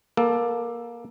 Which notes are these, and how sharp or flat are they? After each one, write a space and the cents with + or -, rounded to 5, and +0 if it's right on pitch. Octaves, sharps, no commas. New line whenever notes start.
A#3 +20 A4 +0